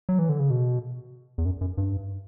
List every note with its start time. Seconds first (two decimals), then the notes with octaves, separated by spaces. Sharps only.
0.09 F#3
0.19 E3
0.29 D3
0.39 C#3
0.50 B2
1.38 E2
1.46 F#2
1.61 F#2
1.78 G2